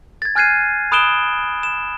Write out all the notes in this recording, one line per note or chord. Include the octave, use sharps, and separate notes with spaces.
G#6 A6
G#5 F6 F#6 G#6 C7 D#7
B5 D#6 F#6 D7 E7 G7
E7